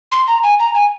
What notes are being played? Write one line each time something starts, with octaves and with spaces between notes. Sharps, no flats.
C6
A#5
G#5
A#5
G#5